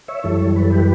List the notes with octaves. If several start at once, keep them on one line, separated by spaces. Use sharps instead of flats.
C#5 E5
F#2 E3 G3 A4 C#5
B4
A4
G4 B4